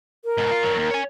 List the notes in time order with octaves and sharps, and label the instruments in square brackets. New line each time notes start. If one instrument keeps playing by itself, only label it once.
[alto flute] A#4
[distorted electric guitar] G#2 B2
F4
G2 F#3
D#2
C#5 G#5